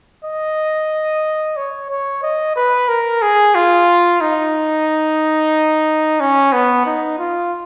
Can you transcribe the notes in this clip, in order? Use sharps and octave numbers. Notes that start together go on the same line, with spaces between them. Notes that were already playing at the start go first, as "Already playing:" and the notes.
D#5
C#5
C#5
D#5
B4
A#4
G#4
F4
D#4
C#4
B3
D#4
F4